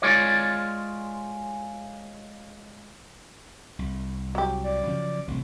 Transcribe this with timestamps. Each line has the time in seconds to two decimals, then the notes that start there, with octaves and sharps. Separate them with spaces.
0.02 G#3 F4 C#5 D5
3.79 C2
4.35 F#3 G4
4.63 D5
4.86 C#3 F3 C#4
5.28 A1 G2 C3